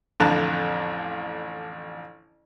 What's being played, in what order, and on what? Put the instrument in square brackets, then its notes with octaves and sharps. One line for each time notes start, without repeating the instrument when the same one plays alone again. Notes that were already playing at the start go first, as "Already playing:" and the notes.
[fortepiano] A1 F2 D3 A5 A#5 F#6